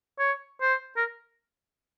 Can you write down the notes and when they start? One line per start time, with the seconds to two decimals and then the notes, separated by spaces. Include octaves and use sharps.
0.19 C#5
0.61 C5
0.97 A#4